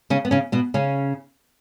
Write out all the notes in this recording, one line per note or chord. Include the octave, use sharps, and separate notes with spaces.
C#3 C#4
B3
C#3 C#4
B2 B3
C#3 C#4